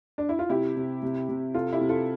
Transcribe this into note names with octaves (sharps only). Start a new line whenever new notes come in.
D4
E4
F4
C3 E4 G4
C3
C3
C3
C3 F4 A4
E4 G4
C3
F4 A4